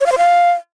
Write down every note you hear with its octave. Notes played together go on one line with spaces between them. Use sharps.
C#5
F5
C5
F5